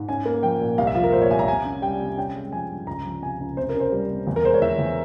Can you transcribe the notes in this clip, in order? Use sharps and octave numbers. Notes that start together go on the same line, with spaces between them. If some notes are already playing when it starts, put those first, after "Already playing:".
Already playing: G#2
C#4 G#5
A#3
F3 G5
A#2
C2 F5
E5
F3 F4
A#4
A#2 C5
C#5
C2 G#5
A#5
C3 G#5
C#4
G3 G5
C3
C#4 G5
G#3
F3 G#5
G2
C#2 A#5
F3
C3 G#5
C#2
C3 C5
A#4
C#4
C5
G3
C3
E2
A#4
G#3 C5
C#5
E3 E5
E2